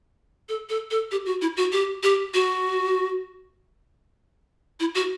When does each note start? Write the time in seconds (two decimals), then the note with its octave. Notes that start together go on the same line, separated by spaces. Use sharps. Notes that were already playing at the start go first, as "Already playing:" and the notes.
0.49 A4
0.69 A4
0.91 A4
1.11 G4
1.26 F#4
1.42 E4
1.57 F#4
1.72 G4
2.03 G4
2.34 F#4
4.80 E4
4.95 F#4